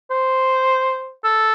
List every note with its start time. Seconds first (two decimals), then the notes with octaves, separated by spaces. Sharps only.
0.11 C5
1.24 A4